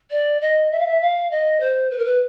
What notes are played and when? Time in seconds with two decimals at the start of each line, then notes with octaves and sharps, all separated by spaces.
0.11 D5
0.41 D#5
0.71 E5
0.79 F5
0.86 E5
1.01 F5
1.31 D#5
1.60 C5
1.91 B4
1.98 A#4
2.05 B4